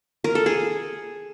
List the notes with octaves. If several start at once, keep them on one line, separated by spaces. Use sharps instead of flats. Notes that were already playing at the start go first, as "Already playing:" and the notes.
A#4
A4
G#4